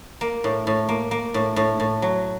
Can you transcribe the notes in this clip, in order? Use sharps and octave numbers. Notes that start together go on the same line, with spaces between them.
A#3
A2
A2
A#3
A#3
A2
A2
A2
F#3